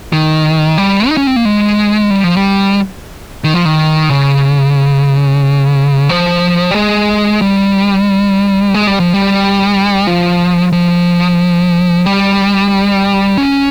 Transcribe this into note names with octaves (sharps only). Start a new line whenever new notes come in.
D#3
G3
D#4
C#4
C4
A#3
G#3
G3
F3
G3
D#3
F3
D#3
C#3
F3
G3
G#3
G3
G#3
G3
F3
G3
F3
F3
G3
C#4